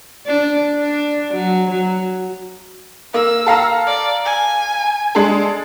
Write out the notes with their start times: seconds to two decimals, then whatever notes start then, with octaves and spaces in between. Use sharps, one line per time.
0.27 D4
0.74 D4
1.33 F#3
1.70 F#3
3.14 A#3 E6
3.46 A4 F5 A#5
3.86 D5
4.25 G#5
5.15 G#3 D4 A4